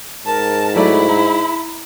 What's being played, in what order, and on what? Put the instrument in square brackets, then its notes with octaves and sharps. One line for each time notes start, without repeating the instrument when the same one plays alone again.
[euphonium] G#2 [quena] A#4 [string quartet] A5
[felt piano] F#3 A3 D5 [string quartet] E4 [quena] B5
[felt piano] A#5